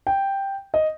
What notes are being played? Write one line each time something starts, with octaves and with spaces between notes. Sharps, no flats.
G5
D#5